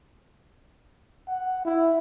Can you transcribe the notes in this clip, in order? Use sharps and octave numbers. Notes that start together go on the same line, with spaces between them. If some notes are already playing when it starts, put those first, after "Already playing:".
F#5
E4